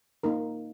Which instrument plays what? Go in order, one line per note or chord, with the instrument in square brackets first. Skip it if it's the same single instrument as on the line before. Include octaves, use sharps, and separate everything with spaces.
[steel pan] A#3 D#4 A#4